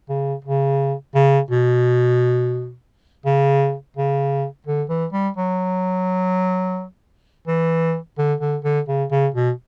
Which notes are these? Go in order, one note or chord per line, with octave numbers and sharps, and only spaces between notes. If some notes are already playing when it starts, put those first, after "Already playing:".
C#3
C#3
C#3
B2
C#3
C#3
D3
E3
G3
F#3
E3
D3
D3
D3
C#3
C#3
B2